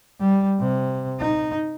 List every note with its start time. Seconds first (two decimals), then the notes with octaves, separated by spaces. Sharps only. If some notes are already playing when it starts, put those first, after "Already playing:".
0.20 G3
0.60 C3
1.20 D#4